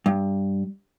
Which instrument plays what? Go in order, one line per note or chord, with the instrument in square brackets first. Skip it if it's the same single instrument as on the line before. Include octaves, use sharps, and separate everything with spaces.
[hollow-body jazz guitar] G2